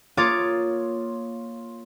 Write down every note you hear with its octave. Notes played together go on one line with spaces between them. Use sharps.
A#3 F4 C#5 D6 D#6 A6